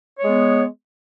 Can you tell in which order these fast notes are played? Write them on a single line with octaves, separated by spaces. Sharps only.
C#5 G#3 B3